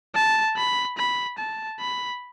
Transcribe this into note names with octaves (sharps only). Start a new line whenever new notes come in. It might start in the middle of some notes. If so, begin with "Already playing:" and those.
A5
B5
B5
A5
B5